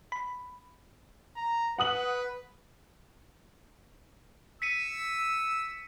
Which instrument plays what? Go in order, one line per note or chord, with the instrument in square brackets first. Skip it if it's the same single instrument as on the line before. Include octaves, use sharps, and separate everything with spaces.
[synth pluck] B5
[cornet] A#5
[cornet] B4 [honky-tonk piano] F#5 D#6 F#7
[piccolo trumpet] E6 [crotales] B6 C#7 D#7